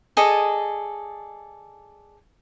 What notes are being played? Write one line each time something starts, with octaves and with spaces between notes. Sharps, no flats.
G#4 A4 D5 D#5